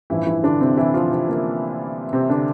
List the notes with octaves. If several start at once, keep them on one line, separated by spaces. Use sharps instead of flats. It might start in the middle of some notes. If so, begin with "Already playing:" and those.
A1 G2 E3 F3 E4
E3 E4
D3 D4
C3 C4
E3 E4
F3 F4
C3 C4
A#3
C3 C4
D3 D4